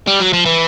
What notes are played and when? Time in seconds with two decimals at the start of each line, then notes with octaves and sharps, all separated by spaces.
0.07 G3
0.20 F#3
0.33 F3
0.45 E3